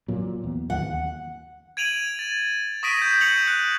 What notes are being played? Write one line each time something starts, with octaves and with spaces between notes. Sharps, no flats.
A#2 F#3 A#3
E2
D#2 F#5
G#6 D7 D#7 F7 F#7
A6
C#6 D#6 A#6 B6 D7 D#7
G6
C#7 F7 F#7
F#6